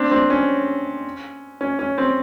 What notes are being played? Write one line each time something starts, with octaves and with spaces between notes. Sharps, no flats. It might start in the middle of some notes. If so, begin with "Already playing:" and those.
Already playing: C4 D4
C4 D4
C#4
C#4
C#4
C4